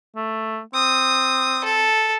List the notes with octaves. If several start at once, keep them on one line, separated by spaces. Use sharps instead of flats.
A3
C4 D#6
A4